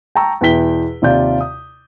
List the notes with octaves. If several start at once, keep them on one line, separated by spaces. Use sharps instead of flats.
G5 A5 A#5 C#6 E6
E2 B2 E4 G5 B6 G7
D#2 C3 F4 D5 G6
D#6